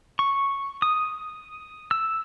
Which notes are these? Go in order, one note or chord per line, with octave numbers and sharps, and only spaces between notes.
C#6
D#6
E6